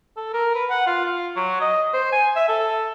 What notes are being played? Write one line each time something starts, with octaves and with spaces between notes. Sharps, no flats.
A4
A#4
B4
F#5
F4
F4
F#3
D#5
C5
G#5
E5
A4